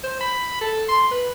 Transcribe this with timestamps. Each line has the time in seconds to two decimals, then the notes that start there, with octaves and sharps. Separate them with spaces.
0.04 C5
0.21 B5
0.61 A4
0.89 C6
1.11 B4